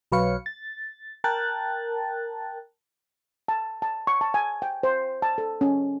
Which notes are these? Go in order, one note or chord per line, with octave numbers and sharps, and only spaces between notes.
B1 F#3 B4 C#5 F5 C#7
A6
A#4 G5 A5 F#6 A6
A5
A5
C#6
A5
G#5
G5
C5
A5
A4
C#4